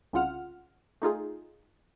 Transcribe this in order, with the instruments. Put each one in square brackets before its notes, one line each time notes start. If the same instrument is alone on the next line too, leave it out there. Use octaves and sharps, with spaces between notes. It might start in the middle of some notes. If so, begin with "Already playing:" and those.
[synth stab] C2 C#3 F4 F#5 F6
A3 D#4 F4 G#4